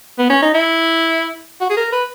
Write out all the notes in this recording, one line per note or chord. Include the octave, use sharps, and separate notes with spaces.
B3
C#4
D#4
E4
F#4
G#4
A#4
B4